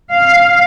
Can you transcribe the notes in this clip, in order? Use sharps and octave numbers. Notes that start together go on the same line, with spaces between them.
F5